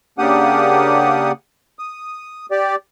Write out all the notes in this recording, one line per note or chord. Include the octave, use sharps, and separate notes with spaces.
C#3 A#3 D4 G4 F#5 D#6
D#6
G4 D5